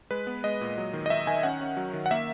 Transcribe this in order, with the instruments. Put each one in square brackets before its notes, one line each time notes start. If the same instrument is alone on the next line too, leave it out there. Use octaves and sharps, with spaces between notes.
[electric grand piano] G#3 B4
B3
G#3 D#5
A#2
F#3
D#3
D#5
D#3 E5
D#3 G#5
C#4 F#5
C#4
F#3
D#3
F#5
A#3 E5